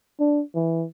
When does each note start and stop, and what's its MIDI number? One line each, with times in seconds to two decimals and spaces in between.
0.20 0.42 62
0.55 0.86 52